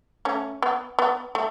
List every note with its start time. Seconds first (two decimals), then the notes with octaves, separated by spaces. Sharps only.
0.25 A3 C#4
0.62 B3
0.99 B3
1.35 A3